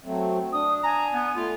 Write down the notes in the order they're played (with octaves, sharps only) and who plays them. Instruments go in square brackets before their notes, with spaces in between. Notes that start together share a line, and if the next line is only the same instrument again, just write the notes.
[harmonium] F#3 A3 C4
[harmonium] D4 [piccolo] D#6
[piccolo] G#5 [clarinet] A#5
[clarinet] B3
[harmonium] A3 [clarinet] F4